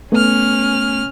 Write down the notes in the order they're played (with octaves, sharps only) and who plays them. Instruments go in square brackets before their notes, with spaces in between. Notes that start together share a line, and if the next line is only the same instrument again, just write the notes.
[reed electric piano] A3 B3 [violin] C#4 F6